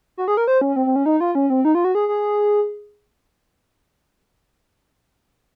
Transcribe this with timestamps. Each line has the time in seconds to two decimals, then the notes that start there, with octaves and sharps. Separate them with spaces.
0.17 F#4
0.28 G#4
0.37 A#4
0.48 C5
0.61 C#4
0.76 C4
0.86 C4
0.96 C#4
1.06 D#4
1.20 F4
1.35 C#4
1.50 C4
1.65 D#4
1.75 F4
1.85 F#4
1.95 G#4
2.09 G#4